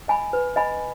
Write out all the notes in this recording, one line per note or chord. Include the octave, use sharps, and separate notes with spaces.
D#5 G#5 B5
B4
D#5 G#5 B5